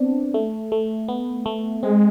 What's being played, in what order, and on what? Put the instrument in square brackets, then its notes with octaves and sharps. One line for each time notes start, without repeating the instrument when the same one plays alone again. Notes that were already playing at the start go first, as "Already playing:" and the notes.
Already playing: [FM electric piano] B3 C4 D4
A3
A3
B3
A3
[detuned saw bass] G#3 [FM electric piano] C4